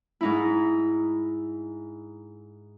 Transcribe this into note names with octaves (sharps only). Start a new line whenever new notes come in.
G#2 D#4 E4